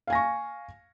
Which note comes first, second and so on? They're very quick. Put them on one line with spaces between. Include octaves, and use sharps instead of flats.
F5 G#5 A#6 C#6